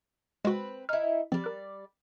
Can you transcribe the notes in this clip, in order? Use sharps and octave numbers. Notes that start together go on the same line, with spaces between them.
G#3 C4 F#4 B4
D#4 E4 F6
F3 G3 C4 D5
A#4 F#6